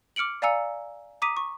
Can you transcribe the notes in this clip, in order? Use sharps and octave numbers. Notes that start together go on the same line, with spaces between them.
D6 F6 C#7 D7 F#7
D5 F5 G#5 A#5 E6 C#7
A#5 D6 D#6 B6 D#7
C#6